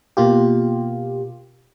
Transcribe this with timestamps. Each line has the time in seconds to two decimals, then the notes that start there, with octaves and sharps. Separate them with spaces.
0.17 B2 A#3 F4 G4